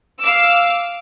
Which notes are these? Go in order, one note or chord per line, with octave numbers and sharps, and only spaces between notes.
F5 D6 E6